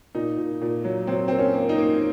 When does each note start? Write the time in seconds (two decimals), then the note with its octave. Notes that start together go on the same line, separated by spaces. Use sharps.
0.15 A#2 D#4
0.37 A#2
0.62 A#2
0.84 F#3
1.07 F#3 C4
1.28 A#3 C4
1.39 C#4
1.54 A#3
1.69 D#4
1.78 A#3